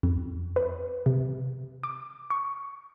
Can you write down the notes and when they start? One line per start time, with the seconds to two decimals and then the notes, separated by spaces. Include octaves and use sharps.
0.03 F2
0.56 B4
1.06 C3
1.83 D6
2.30 C#6